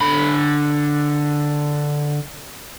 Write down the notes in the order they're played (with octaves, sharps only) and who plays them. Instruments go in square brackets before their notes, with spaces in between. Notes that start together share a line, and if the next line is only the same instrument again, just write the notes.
[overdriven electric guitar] D3 B5